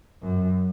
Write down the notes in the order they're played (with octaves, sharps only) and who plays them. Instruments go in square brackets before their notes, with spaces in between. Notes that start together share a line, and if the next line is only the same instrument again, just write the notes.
[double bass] F#2